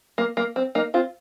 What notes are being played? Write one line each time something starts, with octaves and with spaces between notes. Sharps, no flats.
A#3
A#3
C4
A#3 D#4
C4 F4